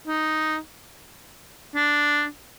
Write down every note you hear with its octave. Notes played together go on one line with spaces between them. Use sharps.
D#4
D4